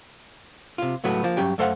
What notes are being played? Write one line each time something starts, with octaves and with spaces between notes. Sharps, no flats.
C3 F4
C#2 A2 F#3 A3 B3
F3 A#3
G2 F#3 C#4 G4 G5
F#2 A3 A4 C5 F5 F#5